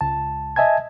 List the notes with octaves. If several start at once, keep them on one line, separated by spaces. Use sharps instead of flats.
C#2 A5
D#5 E5 G#5 A5 G#6